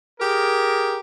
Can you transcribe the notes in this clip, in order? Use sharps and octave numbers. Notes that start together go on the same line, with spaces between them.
G4 G#4 A#4